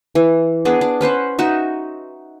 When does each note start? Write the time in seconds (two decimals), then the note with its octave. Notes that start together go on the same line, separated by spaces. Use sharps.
0.15 E3
0.65 B3 D4 G#4
0.81 D4
1.01 C#4 B4 C5 F#5
1.39 D#4 F#4 E5